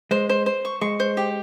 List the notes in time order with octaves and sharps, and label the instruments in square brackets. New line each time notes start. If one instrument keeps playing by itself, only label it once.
[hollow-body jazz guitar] G#3 [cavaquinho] C5
[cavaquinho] C5
C5
C#6
[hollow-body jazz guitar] G#3 [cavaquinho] C#6
[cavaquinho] C5
G4